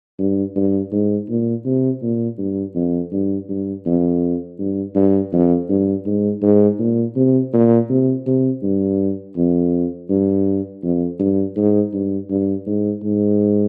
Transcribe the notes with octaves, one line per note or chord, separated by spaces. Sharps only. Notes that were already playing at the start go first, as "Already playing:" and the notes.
G2
G2
G#2
A#2
C3
A#2
G2
F2
G2
G2
F2
G2
G2
F2
G2
G#2
G#2
A#2
C3
A#2
C3
C3
G2
F2
G2
F2
G2
G#2
G2
G2
G#2
G#2